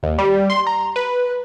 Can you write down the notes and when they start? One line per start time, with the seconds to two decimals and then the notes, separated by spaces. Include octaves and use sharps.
0.03 D#2
0.18 G3
0.50 C6
0.67 A#5
0.96 B4